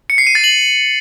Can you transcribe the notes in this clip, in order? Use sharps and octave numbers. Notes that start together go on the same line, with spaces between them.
C#7
C7
D#7
A6
F#7